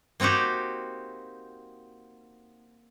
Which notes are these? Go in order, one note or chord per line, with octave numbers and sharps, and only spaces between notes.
A#3 C4 D#4 F#4 G4